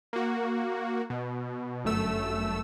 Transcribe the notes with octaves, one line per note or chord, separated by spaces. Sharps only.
A#3 F#4
B2
G1 F#2 A3 E6